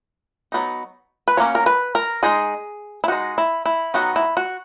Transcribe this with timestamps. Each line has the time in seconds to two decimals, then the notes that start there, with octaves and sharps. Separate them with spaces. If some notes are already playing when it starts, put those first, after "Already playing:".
0.52 F#3 B3 D#4
1.28 B4
1.37 F#3 A#3 C#4 C#5
1.55 A#4
1.66 B4
1.95 A#4
2.23 G#3 D#4 G#4
3.04 E4
3.08 G#3 D#4 F#4
3.38 E4
3.66 E4
3.94 D#3 F#3 B3 D#4 F#4
4.16 E4
4.37 F#4